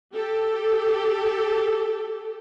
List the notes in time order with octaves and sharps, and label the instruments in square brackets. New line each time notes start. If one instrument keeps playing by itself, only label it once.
[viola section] G4 A4